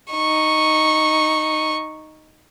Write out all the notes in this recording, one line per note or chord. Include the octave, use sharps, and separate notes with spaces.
D#4 C#6